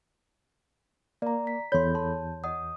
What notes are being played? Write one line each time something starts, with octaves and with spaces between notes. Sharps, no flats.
A#3 D5 A#5
B6
E2 A4 C#5 B5 C6 G6
A5 C6
D#5 F#5 D#6